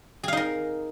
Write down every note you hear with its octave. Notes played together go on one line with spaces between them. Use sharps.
D#4 G#4 A#4 F5